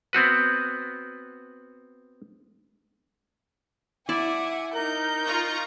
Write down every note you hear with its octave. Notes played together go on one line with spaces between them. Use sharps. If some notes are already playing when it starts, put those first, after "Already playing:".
B3 C4 F#4 B4
E4 D5 E5 F#5 G#5 D6
D#4 A#4 G6
F4 A#5 C#6